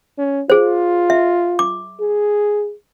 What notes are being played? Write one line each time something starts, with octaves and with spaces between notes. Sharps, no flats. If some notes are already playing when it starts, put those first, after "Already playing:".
C#4
F4 G#4 C5
E5
D6
G#4